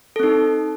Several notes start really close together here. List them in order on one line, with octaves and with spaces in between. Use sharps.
A4 C4 D#4